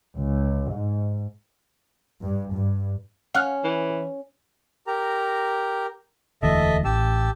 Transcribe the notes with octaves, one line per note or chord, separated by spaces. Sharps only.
C#2
G#2
G2
G2
C#4 F5 F#5
E3
G4 A#4 A#5
E1 D2 E3 A4 D#5 E5
A1 G4 A5 E6